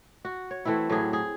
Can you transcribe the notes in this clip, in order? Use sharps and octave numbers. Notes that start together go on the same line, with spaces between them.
F#4
C#5
E3 A3 C4 E4
A2 F#3 G4 G#4
G#4